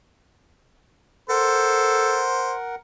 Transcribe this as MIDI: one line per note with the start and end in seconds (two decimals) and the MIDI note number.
1.29 2.24 69
1.29 2.75 70
1.29 2.52 72
1.29 2.75 78